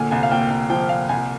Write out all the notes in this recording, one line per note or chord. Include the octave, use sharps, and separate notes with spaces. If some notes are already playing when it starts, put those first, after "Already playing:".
Already playing: D2 A#2 G#5
C2 G#5
F5
A#2 G5
C2
F3 G5
A#2 F5
C2 G#5